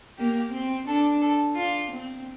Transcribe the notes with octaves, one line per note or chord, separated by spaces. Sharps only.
A#3 G4
C4
D4 A4
A4
D4 F4
C4